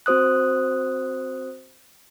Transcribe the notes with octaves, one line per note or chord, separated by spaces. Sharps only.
C4 F#4 C5 D#6 F#6